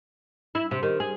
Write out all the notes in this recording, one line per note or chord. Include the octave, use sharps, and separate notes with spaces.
E4
C3
D#3
G#4